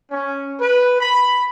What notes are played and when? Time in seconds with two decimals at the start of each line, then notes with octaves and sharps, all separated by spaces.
0.11 C#4
0.60 B4
1.00 B5